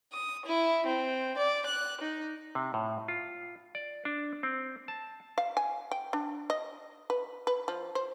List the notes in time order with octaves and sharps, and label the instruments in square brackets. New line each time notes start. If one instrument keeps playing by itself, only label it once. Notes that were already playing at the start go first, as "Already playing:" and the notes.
[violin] D#6
E4
C4
D5
F#6
D#4
[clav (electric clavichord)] C3
A2
F4
D5
D4
C4
A5
[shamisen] F5
G#5
G5
D4
D#5
B4
B4
F3
C5